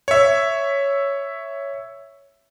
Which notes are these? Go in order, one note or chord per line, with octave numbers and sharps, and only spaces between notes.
C#5 E5